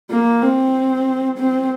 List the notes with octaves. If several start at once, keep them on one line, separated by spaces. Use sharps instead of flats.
A#3
C4
C4